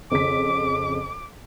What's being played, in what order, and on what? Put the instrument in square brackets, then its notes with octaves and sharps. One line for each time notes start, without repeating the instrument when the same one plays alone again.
[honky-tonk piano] F2 C#3 B6 [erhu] D6